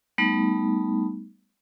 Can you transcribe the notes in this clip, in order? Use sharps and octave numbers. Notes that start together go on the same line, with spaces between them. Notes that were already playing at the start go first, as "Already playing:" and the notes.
G3 A3 B3 D#4